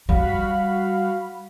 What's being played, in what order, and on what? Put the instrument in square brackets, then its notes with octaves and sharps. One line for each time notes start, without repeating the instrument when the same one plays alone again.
[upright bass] G3 [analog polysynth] F#4 F5 B5